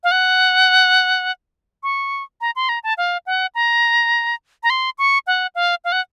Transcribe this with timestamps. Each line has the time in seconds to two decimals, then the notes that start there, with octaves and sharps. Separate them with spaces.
0.04 F5
0.11 F#5
1.83 C#6
2.41 A#5
2.56 C6
2.69 A#5
2.83 A5
2.97 F5
3.26 F#5
3.55 A#5
4.63 A#5
4.70 C6
4.98 C#6
5.27 F#5
5.55 F5
5.84 F5
5.92 F#5